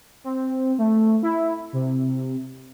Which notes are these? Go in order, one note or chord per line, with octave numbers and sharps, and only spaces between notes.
C4
A3
E4
C3